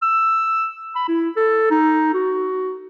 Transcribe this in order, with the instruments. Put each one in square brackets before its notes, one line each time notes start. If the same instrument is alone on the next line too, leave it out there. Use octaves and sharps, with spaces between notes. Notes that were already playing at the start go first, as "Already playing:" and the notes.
[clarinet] E6
B5
E4
A4
D#4
F#4